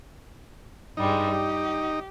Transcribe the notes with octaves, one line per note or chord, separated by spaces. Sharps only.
G2 G3 G#3 D#4
G4